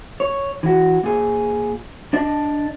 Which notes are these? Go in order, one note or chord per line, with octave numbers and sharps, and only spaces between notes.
C#5
E3 F#4
A#2 G#4
D4 D5 D#5 A5